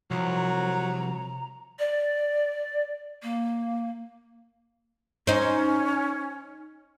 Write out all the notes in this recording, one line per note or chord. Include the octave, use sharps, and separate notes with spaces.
C2 F3 F#3 A#5
D5
A#3
C#4 D#4 C5